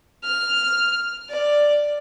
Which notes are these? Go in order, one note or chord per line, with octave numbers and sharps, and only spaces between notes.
F6
D5